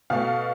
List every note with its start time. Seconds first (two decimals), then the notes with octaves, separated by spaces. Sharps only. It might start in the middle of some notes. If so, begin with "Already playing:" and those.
0.10 B2 A3 F5